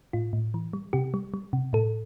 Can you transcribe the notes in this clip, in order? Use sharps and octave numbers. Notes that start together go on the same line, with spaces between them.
A2 F4
A2
E3
G3
C3 G4
G3
G3
C3
A2 A4